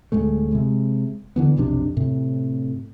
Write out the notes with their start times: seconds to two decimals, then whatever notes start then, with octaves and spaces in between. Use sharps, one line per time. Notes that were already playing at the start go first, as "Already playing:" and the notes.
0.12 D1 A2 G#3 A3
0.52 C3 G#3
1.36 D3 E3 B3
1.57 B1 F2 C3 D4
1.97 A2 C3